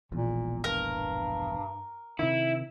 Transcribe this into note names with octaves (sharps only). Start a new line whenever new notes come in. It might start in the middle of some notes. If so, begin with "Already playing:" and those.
E1 A#1 E2 A#2
G2 A#4
C3 D#3 E4